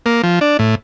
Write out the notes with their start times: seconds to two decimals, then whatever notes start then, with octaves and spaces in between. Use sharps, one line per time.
0.06 A#3
0.23 F3
0.41 D4
0.59 A2